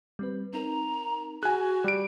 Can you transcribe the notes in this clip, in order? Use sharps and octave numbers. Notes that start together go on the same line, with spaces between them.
G3 C4 B4
C4 D#4 A#4 A#5
F#4 G#4 F#5 G#5 F#6
G3 D7